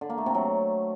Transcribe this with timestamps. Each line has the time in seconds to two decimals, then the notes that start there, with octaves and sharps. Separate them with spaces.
0.01 D3
0.10 A#3
0.18 A3
0.26 C3
0.35 F#3